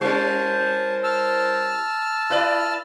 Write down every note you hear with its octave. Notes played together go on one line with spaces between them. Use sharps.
G3 C#4 E4 A#4 C5 G#5 A5
A5 E6 F6
E4 B4 D5